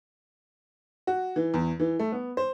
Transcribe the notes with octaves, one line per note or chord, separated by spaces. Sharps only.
F#4
E3
E2
E3
A3
B3
C5